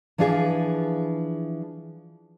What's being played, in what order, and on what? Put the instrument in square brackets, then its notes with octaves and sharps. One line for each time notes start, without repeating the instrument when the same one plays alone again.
[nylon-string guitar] E3 F3 D4 F4 G#4